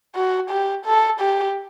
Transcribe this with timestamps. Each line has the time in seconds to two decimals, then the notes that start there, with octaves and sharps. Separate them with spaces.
0.15 F#4
0.50 G4
0.85 A4
1.20 G4